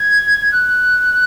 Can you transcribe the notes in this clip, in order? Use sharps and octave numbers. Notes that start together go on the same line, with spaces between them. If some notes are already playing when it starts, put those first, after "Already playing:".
Already playing: G#6
F#6